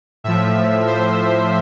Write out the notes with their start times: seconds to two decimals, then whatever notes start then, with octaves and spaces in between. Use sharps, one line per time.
0.24 A2 F3 E5
0.87 C5